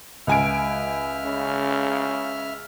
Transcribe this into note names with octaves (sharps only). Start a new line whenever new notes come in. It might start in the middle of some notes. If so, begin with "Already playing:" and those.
C#2 E5 G#5 F6 D7
C#3